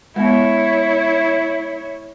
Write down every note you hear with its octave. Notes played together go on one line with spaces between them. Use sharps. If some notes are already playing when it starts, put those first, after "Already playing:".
G#3 B3 E4 C#5